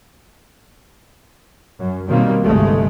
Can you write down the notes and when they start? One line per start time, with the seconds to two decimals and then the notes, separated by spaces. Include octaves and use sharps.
1.79 F#2
2.09 B2 D#3 F#3 G3 A#3 C4
2.43 G1 C2 G#3 A3